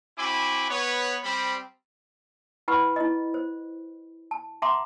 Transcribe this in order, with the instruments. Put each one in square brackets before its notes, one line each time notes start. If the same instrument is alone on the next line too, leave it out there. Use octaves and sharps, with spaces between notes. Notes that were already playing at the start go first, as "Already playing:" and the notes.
[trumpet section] C4 E4 F#4 G#5 B5 D6
B3 B4 C#5
G3 C4 B5
[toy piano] E4 B4 F#5 B5 C#6
E4 D#5
C5
A5
E5 F#5 A5 A#5 C6 D6